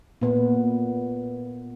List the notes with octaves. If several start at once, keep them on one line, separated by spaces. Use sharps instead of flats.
A#2 B3